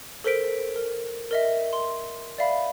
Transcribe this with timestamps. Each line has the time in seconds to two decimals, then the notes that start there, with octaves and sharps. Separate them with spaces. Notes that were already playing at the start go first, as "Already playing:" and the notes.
0.24 A4 A#4 C5 B6 D7
0.76 A#4
1.31 A#4 D#5 E5
1.73 C6
2.38 D5 E5 F5 B5